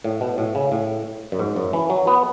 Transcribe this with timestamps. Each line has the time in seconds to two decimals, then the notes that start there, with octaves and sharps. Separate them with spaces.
0.04 A2
0.21 B2
0.38 A2
0.55 C#3
0.72 A2
1.32 F#2
1.39 G#2
1.56 F#2
1.73 E3
1.90 F#3
2.07 B3